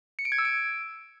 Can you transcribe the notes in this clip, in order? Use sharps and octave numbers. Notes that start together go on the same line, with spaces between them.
C#7
D7
G#6
E6
D7